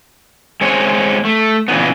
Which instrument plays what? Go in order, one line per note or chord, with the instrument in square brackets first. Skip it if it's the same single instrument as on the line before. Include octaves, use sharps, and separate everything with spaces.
[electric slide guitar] G#3 C4 C#5
A3
A#2 C#3 E3 F#3 B3